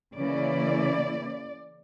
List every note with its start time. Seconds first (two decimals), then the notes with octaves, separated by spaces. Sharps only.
0.16 C#3 E3 A#3 C#4 E4 D5